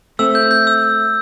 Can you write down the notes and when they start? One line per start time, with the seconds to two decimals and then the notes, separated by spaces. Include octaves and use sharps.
0.19 A3 C4 E6
0.35 G6
0.51 G6
0.67 E6